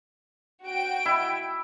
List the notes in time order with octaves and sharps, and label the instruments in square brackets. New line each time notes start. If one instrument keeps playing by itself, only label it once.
[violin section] F#4 G5 D7
[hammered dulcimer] E4